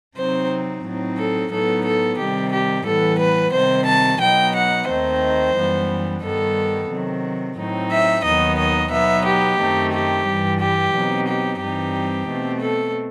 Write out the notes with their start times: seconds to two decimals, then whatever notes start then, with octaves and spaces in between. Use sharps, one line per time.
0.17 C3 F#3 C4 D#4 C5
0.84 A2 F#3 C4 D#4
1.18 A4
1.51 A2 F#3 B3 D#4 A4
1.85 A4
2.18 C3 D#3 G3 G4
2.53 G4
2.86 A2 E3 G3 B3 A4
3.20 B4
3.53 C3 D#3 G3 C5
3.87 A5
4.21 B2 F#3 B3 D#4 G5
4.54 F#5
4.88 D#2 D#3 A3 C4 D#4 C5
5.56 F#2 E3 G3 B3
6.22 G2 D#3 G3 B3 A4
6.89 C3 D#3 F#3
7.57 A2 F#3 C4 D#4
7.91 E5
8.25 D#2 D#3 F#3 B3 D#4 D#5
8.58 D#5
8.91 B2 F#3 B3 D#4 E5
9.26 G4
9.59 F#2 D#3 A3 C4 D#4
9.93 G4
10.27 G2 E3 G3
10.60 G4
10.94 B2 F#3 C4 D#4
11.27 G4
11.61 G2 E3 G3 C4 D#4 G4
12.28 B2 A3 C4
12.62 A4